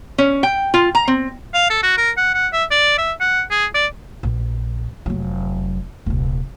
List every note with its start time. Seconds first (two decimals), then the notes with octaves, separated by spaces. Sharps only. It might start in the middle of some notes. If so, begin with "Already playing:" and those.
0.18 C#4
0.43 G5
0.74 F4
0.95 A#5
1.08 C4
1.54 F5
1.70 A4
1.83 F#4
1.97 A#4
2.17 F#5
2.34 F#5
2.53 E5
2.71 D5
2.98 E5
3.21 F#5
3.51 G#4
3.74 D5
4.23 A#1
5.06 F1 F#3
6.06 D#1 C2